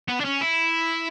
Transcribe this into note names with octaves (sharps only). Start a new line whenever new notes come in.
B3
D4
C#4
E4